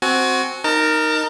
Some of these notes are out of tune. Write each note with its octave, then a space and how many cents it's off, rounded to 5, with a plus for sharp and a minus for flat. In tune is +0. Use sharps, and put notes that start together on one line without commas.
C4 +0 F#4 +0 G#5 +35
D#4 +0 A#4 +0 A5 +40